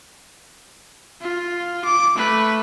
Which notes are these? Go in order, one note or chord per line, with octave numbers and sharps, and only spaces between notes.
F4
D6
A3 B4